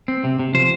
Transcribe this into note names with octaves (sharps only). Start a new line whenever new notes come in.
C4
C3
C3
F3 C5